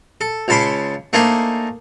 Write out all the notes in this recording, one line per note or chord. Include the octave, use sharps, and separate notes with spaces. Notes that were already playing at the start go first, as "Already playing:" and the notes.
A4
C#2 C#3 A5 B5 C6 D6
A3 A#3 D4 D#4 C5 G#5